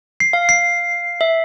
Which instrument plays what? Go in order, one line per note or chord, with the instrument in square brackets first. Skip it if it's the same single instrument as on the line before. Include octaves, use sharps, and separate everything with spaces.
[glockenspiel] C7
[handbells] F5
[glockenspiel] C7
[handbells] E5